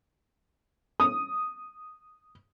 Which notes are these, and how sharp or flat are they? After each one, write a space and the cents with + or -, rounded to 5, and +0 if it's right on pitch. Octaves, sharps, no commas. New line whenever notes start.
D#6 -5